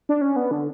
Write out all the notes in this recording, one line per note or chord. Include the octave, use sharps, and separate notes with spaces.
D4
C#4
B3
D3